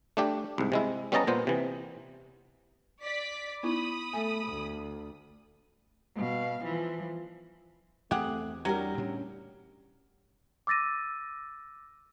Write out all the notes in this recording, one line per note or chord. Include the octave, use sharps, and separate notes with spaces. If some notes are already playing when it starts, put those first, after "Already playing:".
A3 D4 G4
C2 G#2
C3 G#3 E4
G3 B3 C#4 D#5 A5 A#5
A#2 B3 C5
C3 E3
D5 B6
B3 D#4 E4 B5 D#6
A3 G#5
D2
B2 F5
E3 F3
E2 A3 C4 G4 G#4 F#5
F#3 G3 D4 E4 G4 A#4
A2 C#4 D4
D6 E6 A6 A#6 D#7